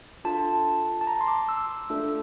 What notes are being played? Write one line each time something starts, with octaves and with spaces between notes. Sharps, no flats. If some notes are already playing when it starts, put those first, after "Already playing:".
D4 F4 A4 A5
A5
A#5
C6
D6
E6
A3 D4 F4 A4